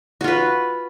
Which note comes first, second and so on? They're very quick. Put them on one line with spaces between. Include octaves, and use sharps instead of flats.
F#4 F4 B4